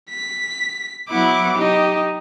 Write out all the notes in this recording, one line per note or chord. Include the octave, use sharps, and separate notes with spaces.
B6
F#3 B3 E4 F#5 D6
D#4 G4